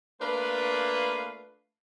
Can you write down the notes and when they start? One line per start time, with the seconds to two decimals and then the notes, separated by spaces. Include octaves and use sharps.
0.21 A3 A#3 D4 F4 B4